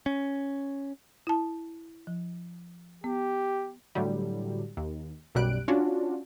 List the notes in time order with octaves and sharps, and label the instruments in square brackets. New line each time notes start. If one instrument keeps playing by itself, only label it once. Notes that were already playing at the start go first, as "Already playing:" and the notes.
[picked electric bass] C#4
[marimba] E4 A5
F3
[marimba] B3 [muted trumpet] G4
[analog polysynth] A2 D3 F#3 G3
D#2
B1 F#2 B2 G3 F#6 D7
C#4 D4 F4 F#4